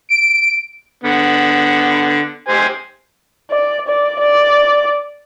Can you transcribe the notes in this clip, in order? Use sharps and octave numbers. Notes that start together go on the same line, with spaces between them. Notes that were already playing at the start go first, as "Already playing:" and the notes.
D7
D3 B3
G4 C5 G#5
D5
D5
D5